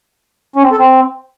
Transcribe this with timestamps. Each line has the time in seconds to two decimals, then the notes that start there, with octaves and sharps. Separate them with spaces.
0.56 C#4
0.63 C4
0.71 A4
0.79 C4